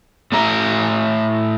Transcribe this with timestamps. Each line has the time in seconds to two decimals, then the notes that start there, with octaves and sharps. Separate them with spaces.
0.32 A2 A3 A4 E5 A#5